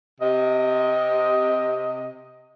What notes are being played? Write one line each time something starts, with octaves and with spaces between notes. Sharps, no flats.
C3 D#5